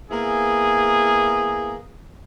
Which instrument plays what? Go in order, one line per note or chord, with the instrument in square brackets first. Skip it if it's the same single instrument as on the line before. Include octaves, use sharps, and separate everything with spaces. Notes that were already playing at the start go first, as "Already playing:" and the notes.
[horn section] A#3 B3 E4 G#4